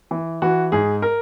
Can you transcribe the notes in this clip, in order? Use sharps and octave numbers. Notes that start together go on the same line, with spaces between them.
E3
E3 F#4
G#2 G#4
A#4